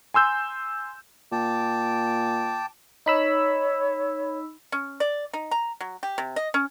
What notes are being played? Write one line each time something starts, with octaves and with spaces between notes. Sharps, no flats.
G#5 C6 E6 G6
A#2 G5 A5 D6
D#4 C#5 B5 E6
C#4
D5
D#4
A#5
F#3
G4
C3
D#5
C#4